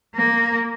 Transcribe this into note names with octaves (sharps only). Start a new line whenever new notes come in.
A#3